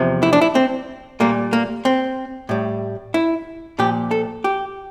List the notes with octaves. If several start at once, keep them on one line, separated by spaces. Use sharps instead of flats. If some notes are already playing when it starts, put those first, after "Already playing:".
Already playing: E2 C3 F3
E4
D4
E4
C4
A#2 G3 A#3
A#3
C4
A2 G3
E4
A#2 F3 G4
A4
G4